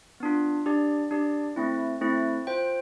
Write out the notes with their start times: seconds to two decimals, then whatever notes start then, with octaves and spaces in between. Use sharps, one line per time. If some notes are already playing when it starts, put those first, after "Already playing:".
0.20 B3 D4 F4
0.66 D4 G4 D5
1.11 D4 G4 D5
1.56 A3 C4 E4
2.01 A3 C4 E4
2.47 F4 C5 G5